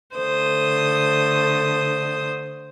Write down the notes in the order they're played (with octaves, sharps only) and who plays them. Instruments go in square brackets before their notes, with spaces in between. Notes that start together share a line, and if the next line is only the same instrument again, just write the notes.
[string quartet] D3 A3 D#6 [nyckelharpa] C5